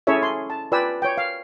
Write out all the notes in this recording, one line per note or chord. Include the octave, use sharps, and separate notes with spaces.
C#4 E4 G#4 A4 C#5 E5
C6
A5
F4 B4 D5 G5 G#5 E6
C#5 G5
F5